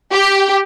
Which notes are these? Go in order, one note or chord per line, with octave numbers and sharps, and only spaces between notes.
G4